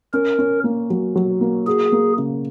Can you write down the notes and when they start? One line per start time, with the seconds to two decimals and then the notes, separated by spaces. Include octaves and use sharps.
0.14 C#4 A#4
0.39 C#4
0.64 A#3
0.90 F#3
1.16 F#3
1.41 A#3
1.66 F#4 G#4
1.92 A#3
2.18 C#3